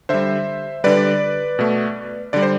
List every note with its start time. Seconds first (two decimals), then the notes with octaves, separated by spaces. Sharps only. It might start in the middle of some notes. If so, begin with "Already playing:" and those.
0.09 D3 G3 C5 E5
0.84 D3 G3 B4 D5
1.59 B2 A3
2.33 D3 G3 D5
2.42 C5